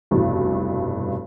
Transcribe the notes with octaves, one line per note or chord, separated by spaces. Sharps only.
F1 B1 G2 E3